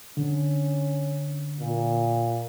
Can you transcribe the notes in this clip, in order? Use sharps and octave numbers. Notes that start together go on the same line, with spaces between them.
D3 C#4
A#2